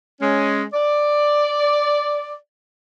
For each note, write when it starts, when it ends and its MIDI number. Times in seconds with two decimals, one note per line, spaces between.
0.21 0.63 56
0.21 0.63 61
0.73 2.33 74